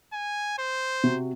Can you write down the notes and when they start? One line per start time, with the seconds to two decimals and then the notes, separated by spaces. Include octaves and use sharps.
0.13 G#5
0.58 C5
1.04 C3 F#4